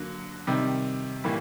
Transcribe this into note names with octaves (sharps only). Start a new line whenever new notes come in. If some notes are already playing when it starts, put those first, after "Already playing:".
Already playing: D3 F#3 A#3
C3 D#3 G3
A2 E3 G3 A#3